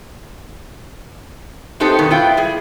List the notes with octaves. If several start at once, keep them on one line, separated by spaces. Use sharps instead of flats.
B3 C4 D#4 G4 A4 C5
G2 B2 D#3
B3 E4 F4 G5
G3 G#4